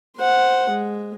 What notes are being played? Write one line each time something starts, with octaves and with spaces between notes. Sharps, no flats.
C5 F#5
G#3